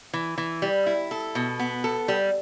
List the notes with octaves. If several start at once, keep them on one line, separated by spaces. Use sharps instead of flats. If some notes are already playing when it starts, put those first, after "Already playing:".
E3
E3
G3
E4
A4
B2
B3
A4
G3